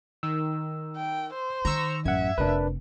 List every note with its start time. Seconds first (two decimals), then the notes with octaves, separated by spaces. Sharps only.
0.23 D#3 E6
0.96 G5
1.34 C5
1.65 D#3 A#5 C#6 E6
2.05 A1 F#2 E5 F#5 G#6
2.38 F1 C3 D4 A#4 B4